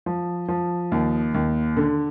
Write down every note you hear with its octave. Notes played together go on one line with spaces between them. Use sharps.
F3
F3
D#2
D#2
D3